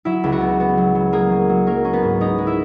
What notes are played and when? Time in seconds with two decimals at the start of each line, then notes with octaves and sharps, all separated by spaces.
0.05 F#3 E4 E5
0.24 C#2
0.32 F#4
0.41 B3
0.60 B3
0.78 F#3
0.95 F#3
1.13 A#3 G#4
1.31 F#3
1.49 F#3
1.67 A#3 C#4 A#4
1.85 C#4
1.93 B3 B4
2.03 G#2
2.21 G#3 D#4 D#5
2.38 G#3
2.47 E4 E5